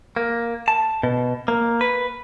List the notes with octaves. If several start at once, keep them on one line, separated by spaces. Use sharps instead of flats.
A#3
A5
B2
A#3
B4